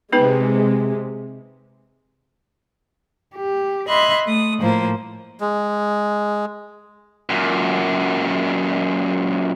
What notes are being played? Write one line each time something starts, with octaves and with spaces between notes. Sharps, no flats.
C3 G#3 B3 D#4 B4
G4
D#5 E5 B5 C6 F#6 G#6
A3 D#6
A2 F3 A#3 C5
G#3
F#2 A#2